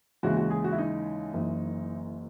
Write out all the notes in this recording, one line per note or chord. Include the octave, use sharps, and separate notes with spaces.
D#2 C#3 E3 G#3 F#4
F#4
G#4
F#4
E4
D#4
F#1 F#2 E3